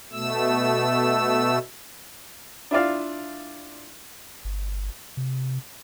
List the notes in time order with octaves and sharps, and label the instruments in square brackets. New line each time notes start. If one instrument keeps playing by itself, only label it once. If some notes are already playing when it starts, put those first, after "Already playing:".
[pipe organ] B2 A3 E6
[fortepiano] D4 E4 F4 D5 F5
[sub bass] G1
C3